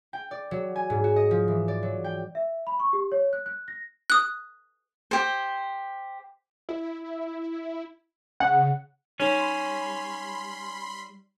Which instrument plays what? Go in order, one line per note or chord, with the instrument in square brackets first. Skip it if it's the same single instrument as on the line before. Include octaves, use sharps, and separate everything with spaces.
[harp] G5
D5
F#3
G#5
G#2
F#4
D#5
F3
E3
D5
F#3
G5
[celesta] E5
B5
C#6
G4
C#5
F#6
F#6
A#6
[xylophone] D#6 F#6
[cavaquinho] G4 C5
[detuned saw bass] E4
[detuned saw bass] C#3 [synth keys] F#5
[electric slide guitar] G3 [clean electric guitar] C#4 [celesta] D#4 C#5 [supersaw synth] B5 C6